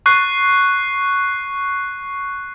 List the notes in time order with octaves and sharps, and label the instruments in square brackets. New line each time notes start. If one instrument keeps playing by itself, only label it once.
[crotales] C#6 F#6 C7